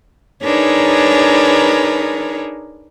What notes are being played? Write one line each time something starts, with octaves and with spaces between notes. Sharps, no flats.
D4 D#4 G#4 A#4 B4 C#5